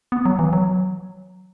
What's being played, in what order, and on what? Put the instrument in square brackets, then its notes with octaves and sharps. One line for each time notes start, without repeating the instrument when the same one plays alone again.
[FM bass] B3
F#3
E3
F#3